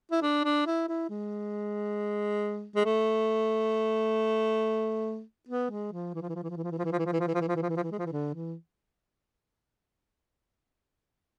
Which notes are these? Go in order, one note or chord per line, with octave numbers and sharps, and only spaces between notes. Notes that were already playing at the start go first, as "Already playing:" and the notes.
E4
D4
D4
E4
E4
G#3
G#3
A3
B3
G#3
F3
E3
F3
E3
F3
E3
F3
E3
F3
E3
F3
E3
F3
E3
F3
E3
F3
E3
F3
E3
F3
E3
F3
E3
F3
E3
G#3
F3
E3
D3
E3